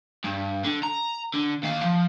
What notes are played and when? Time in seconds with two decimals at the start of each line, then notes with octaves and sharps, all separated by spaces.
0.24 G2
0.65 D3
0.83 A#5
1.34 D3
1.63 D#2 F5
1.83 F3